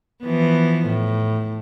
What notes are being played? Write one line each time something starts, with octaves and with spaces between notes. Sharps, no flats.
E3 F3 B3
A2